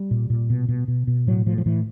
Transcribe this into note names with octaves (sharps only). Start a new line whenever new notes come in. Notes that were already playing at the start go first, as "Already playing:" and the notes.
Already playing: G3
A#2
A#2
B2
B2
B2
B2
A2 F#3
A2 F3
F3
A2 E3